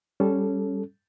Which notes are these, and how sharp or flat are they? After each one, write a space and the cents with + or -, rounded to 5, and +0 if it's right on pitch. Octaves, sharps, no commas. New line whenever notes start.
G3 +0 C#4 +0 A4 -15